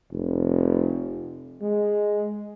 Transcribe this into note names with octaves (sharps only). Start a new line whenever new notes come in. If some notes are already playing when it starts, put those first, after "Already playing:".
F1
G#3